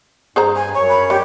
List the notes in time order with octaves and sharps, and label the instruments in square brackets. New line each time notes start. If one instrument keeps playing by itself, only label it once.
[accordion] G2 [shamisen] G#4 C5 A#5
[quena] G#5
[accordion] F#2 C#5 [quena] C#6
[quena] B5
[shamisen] G3 [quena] G4